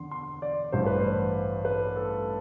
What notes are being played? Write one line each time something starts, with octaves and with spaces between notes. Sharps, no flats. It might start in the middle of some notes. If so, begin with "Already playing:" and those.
Already playing: E2 D3 C6
C6
D5
A1 G2 E3 G3 C5
B4
C5
B4
A4